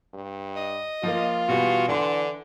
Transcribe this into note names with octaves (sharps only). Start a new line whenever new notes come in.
G2
D#5
F3 A#3 F4
B2 E3 G3 F#4
D3 E3 D4 F#5 C6